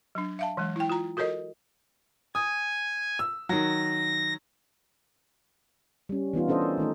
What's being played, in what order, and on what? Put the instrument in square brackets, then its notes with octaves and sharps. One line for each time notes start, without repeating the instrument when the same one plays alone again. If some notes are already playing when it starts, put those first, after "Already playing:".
[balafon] F#3 D4
E5 F5 A5
E3 F#3 G#3
E4 G5
F4 A#5
F#4 A4 A#4 C#5 D#5
[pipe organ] G#5 [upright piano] D#6
[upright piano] E6
[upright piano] D#3 F#3 [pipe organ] A#6
[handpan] G3 C#4
E3 B3 D#4 F4
C#4 D4 A4 C5 D#5
A#4
D#3 A3 D#4